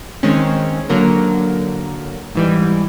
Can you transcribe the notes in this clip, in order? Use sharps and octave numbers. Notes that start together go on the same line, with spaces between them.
D#3 G#3 C4 C#4
D3 F#3 A#3 A#4
G#2 E3 G3